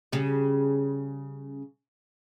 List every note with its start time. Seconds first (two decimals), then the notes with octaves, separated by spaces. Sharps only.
0.12 C#3 G3